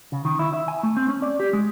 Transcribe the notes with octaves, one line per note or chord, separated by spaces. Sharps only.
C#3
D#3
E4
E5
G#5
A3
C4
C#4
D5
G4
G#3